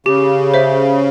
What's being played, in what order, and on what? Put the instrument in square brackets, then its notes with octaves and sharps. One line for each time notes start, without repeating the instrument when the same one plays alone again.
[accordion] C#3 [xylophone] G4
[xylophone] C5 E5